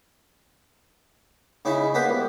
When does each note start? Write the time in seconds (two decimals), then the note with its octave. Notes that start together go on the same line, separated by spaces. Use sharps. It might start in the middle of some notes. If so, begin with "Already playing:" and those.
1.65 C#3 D#4 E4 G#4
1.94 A#3 B3 B4 C5
2.09 C2